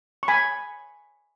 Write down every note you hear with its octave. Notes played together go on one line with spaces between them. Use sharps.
C#6
G#5 B5